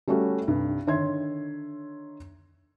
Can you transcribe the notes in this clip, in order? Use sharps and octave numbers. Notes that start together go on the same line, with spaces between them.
G3 A3 C#4 F#4
C2 G2
D3 D#3 C#5 E5 C6 G#6